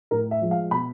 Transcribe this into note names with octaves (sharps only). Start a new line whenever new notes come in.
A2 A#4
E5
F3 G#3
F5
B2 B5